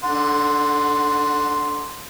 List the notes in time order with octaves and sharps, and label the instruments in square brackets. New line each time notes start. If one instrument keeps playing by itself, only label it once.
[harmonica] D3 F#5 C6